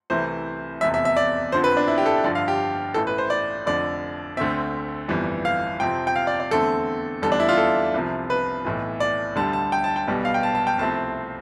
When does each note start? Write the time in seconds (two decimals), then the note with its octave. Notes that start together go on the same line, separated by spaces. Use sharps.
0.10 C2 C3 E3 A3 C5
0.81 F1 E2 C3 E5
0.94 E5
1.05 E5
1.17 D5
1.52 F2 D3 F3 C4 C5
1.64 B4
1.77 D4
1.88 E4
1.98 G4
2.06 A4
2.24 G2 D3 F3 D5
2.35 F5
2.48 G4
2.94 A1 A2 E3 A4
3.07 B4
3.18 C5
3.30 D5
3.66 F1 F2 D3 D5
4.37 D2 D3 A3 C4 E5
5.08 G1 F2 E3 G3
5.45 F5
5.80 F2 C3 F3 C4 G5
6.07 G5
6.16 F5
6.27 D5
6.40 D5
6.51 E2 D3 A3 C4 A4
7.22 F1 E2 D3 G3 A4
7.32 D4
7.40 E4
7.49 F4
7.58 A4
7.94 C2 C3 F3
8.30 B4
8.65 B1 A2 E3
9.00 D5
9.36 D2 D3 G3 A5
9.53 A5
9.72 G5
9.84 A5
9.96 G5
10.07 B1 B2 G3 B3
10.25 F5
10.34 G5
10.43 A5
10.55 A5
10.67 G5
10.78 C2 C3 F3 A3 C4 A5